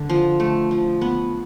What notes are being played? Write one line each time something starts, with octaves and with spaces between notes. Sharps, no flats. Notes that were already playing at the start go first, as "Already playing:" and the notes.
Already playing: D3
F3
A3
F3
B3